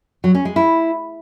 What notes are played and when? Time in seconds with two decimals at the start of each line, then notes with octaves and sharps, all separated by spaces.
0.24 F#3
0.35 C#4
0.45 G#3
0.56 E4